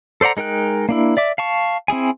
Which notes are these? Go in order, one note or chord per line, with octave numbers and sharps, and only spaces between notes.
A4 C5 D5 F#5 A#5
G#3 D#4 A#4 G5 F#6
A#3 D4 E4
D5 E5 D6
F5 A5 C#6
C4 E4 G#4 G#5